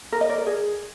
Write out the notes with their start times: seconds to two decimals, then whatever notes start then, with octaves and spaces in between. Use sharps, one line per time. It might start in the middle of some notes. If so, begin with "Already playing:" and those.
0.12 A#4
0.21 D#5
0.29 D5
0.38 A#4
0.46 G#4